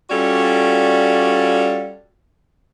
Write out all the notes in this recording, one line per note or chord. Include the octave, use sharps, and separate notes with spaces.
G3 C#4 F4 F#4 A4 D5